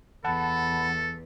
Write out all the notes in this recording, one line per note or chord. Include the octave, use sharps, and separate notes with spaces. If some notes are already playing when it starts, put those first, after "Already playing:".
E2 A4 F#5 A5 B5